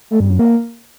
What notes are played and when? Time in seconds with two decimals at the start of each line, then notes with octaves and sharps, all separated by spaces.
0.11 A3
0.20 G2
0.30 F#2
0.39 A#3